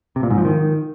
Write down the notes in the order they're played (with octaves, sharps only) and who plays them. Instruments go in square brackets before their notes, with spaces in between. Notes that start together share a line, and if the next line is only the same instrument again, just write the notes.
[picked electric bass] C3
A#2
G#2
F3
D#3